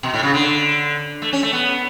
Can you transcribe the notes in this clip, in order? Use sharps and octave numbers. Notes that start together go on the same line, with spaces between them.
B2
A2
C#3
D3
A3
C#4
A3
B3